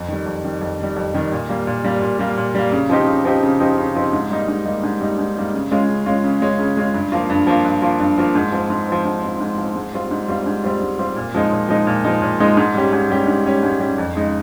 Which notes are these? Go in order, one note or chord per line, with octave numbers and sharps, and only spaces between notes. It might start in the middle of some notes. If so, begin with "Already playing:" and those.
Already playing: F2
D#3 G3
F2
D#3 G3
F2
D#3 G3
F2
D#3 G3
A#2
G3 A#3
A#2
G3 A#3
A#2
G3 A#3
A#2
G3 A#3
C#3
F3 C4 D#4 G4
C#3
F3 C4 D#4 G4
C#3
F3 C4 D#4 G4
C#3
F3 C4 D#4 G4
G#2
G3 A#3 D#4
G#2
G3 A#3 D#4
G#2
G3 A#3 D#4
G#2
G3 A#3 D#4
C#3
G#3 C#4 F4
C#3
G#3 C#4 F4
C#3
G#3 C#4 F4
C#3
G#3 C#4 F4
G2
F3 A#3 F4
G2
F3 A#3 F4
G2
F3 A#3 F4
G2
F3 A#3 F4
G#2
F3 C4
G#2
F3 C4
G#2
F3 C4
G#2
F3 C4
G#2
G3 C4 F4
G#2
G3 C4 F4
G#2
G3 C4 F4
G#2
G3 C4 F4
A#2
F3 G#3 D#4
A#2
F3 G#3 D#4
A#2
F3 G#3 D#4
A#2
F3 G#3 D#4
G#2
G3 C#4 G4
G#2
G3 C#4 G4
G#2
G3 C#4 G4
G#2
G3 C#4 G4
F2
C#3 G#3 D#4